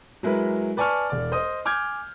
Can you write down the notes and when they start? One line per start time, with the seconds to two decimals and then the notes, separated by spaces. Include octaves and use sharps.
0.23 F#3 G#3 E4 A#4 B4
0.77 B4 D5 G#5 A5 C#6 F6
1.10 E1 D5
1.32 C5 D#5 D#6
1.65 G#5 D6 F6 G6 G#6